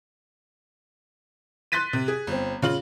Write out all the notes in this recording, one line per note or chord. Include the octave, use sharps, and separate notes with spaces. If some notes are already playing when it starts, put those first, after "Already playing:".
C6 F#6 A6 B6 D#7
C3
G#4
G1 C4
C#3 F4 F#7